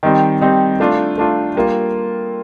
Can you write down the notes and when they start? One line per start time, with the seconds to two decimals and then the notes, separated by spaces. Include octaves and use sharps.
0.03 D#3 G3 C4 D#4
0.41 D#3 G3 C4 D#4
0.80 A3 D4 F4
1.18 A3 D4 F4
1.55 G3 A#3 F4